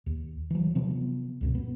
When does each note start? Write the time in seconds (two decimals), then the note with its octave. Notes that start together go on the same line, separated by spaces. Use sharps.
0.06 D#2
0.51 E3 F#3
0.75 C3 F3 B3
1.41 C#2 F#2 B2
1.55 B3